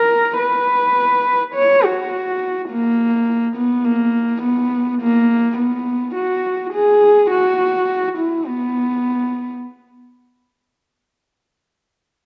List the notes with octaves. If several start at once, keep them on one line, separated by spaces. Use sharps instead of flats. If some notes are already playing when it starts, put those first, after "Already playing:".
Already playing: A#4
B4
C#5
F#4
A#3
B3
A#3
B3
A#3
B3
F#4
G#4
F#4
E4
B3